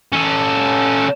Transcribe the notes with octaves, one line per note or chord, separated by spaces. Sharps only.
C#4 A4